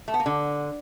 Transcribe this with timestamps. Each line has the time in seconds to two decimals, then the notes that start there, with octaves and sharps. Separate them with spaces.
0.08 A3
0.14 B3
0.20 A#3
0.26 D3